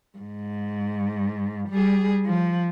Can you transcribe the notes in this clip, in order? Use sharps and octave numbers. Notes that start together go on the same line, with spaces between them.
G#2
G3 G#4
F3